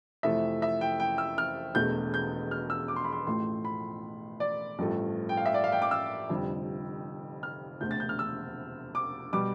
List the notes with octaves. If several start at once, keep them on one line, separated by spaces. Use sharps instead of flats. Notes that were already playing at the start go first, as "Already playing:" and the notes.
F2 C3 E3 A3 E5
E5
G5
G5
E6
F6
E1 E2 B2 A3 G6
G6
F6
E6
D6
C6
B5
C6
A1 A2 F3 A3 C6
B5
D5
A1 G2 F3 A3
G5
F5
E5
D5
F5
G5
D6
E6
F1 F2 D3 G3
F6
E1 D2 C3 G6
A6
G6
F6
E6
D6
B2 G3 D6